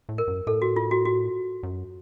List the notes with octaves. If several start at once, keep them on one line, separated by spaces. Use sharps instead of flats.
A2
A#4
F#2
A2 A4
F#4
F4
F#4
F#4
F#2